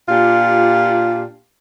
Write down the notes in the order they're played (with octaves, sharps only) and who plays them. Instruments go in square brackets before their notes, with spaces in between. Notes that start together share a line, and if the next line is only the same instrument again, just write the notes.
[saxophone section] A#2 D4 F4 G4